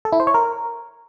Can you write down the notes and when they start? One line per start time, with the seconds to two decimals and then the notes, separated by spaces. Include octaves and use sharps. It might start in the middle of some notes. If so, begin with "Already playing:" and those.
0.05 A4
0.12 E4
0.20 C5
0.27 C#5
0.34 A#4